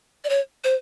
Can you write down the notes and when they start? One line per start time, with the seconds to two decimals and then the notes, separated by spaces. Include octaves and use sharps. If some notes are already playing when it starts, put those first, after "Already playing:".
0.24 D5
0.29 C#5
0.64 C5